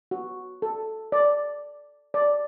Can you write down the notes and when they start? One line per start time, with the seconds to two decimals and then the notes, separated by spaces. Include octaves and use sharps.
0.11 F#4
0.62 A4
1.12 D5
2.14 D5